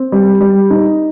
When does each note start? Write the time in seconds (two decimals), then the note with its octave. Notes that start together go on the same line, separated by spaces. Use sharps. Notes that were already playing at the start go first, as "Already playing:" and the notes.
Already playing: C4
0.12 G3
0.41 G3
0.70 D#4